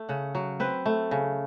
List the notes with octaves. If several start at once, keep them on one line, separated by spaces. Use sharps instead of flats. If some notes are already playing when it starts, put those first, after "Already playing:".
Already playing: A3
C#3 F#5
F#3
C4 B4
A3
C#3